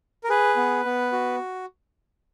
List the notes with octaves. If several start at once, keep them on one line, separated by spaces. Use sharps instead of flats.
A#4
G#4 B4
B3
B3
F#4